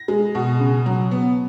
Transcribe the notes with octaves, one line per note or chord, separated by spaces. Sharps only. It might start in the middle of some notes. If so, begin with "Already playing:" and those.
Already playing: A#6
G#3
B2
C#3
F#3
B3